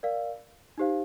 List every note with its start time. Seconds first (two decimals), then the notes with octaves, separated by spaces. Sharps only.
0.03 A#4 D5 F5
0.78 D#4 G4 C5 F5